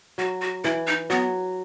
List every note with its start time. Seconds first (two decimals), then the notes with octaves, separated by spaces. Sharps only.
0.18 F#3 F#4
0.42 F#4
0.64 E3 E4
0.87 D#4
1.10 F#3 B3